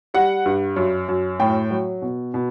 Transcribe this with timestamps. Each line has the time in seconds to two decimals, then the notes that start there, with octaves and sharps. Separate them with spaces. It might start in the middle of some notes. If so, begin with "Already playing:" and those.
0.14 G3 F#5
0.46 G2
0.76 F#2
1.08 F#2
1.40 A2 G5
1.71 F#3
2.02 B2
2.34 B2